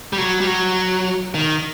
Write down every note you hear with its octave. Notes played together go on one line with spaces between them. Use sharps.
G3
F#3
G3
F#3
D#3